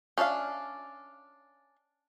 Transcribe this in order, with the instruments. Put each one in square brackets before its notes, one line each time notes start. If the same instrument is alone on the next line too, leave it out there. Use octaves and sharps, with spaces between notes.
[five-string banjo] C#4 D4 E5 F5